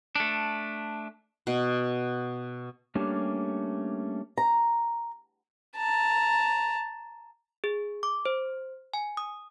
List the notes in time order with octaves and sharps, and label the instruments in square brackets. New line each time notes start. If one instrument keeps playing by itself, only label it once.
[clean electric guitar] A3 D4
[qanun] B2
[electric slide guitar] G3 A3 A#3 C#4 D4 G4
[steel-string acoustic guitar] A#5
[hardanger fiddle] A5 A#5
[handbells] G#4
D6
C5
G#5
D#6